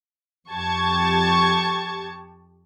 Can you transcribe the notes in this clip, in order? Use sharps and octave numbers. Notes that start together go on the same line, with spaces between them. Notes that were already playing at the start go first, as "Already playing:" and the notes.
F2 G4 A5 C#6 G#6